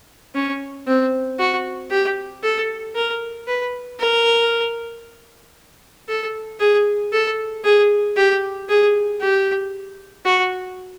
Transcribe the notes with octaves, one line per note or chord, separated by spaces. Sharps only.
C#4
C4
F#4
G4
A4
A#4
B4
A#4
A4
G#4
A4
G#4
G4
G#4
G4
F#4